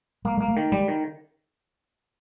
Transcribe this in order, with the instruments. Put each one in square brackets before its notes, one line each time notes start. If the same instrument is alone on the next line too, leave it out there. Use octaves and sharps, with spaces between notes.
[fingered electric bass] G#3 [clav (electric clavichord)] A#3
[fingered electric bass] G#3 [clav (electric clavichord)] A#3
[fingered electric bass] A3
[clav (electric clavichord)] D#3
[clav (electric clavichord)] G3 [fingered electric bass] G#3
[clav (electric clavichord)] D#3